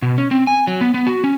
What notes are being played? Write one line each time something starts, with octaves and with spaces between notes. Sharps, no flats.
B2
C#4
C4
G#5
F#3
B3
B3
F#4
C#4